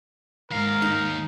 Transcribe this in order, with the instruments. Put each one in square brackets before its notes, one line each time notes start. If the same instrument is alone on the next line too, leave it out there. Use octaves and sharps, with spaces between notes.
[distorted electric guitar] D#2 F5 [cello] G#2 [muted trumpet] A#4
[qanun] D#4